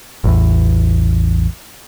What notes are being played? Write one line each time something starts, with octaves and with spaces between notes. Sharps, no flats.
A1 E2